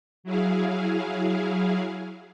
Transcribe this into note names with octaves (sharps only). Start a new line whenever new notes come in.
F#3 E4 G#4 F5